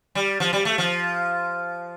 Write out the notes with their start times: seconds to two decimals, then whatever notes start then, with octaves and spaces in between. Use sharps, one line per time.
0.15 G3
0.40 F3
0.53 G3
0.65 A3
0.78 F3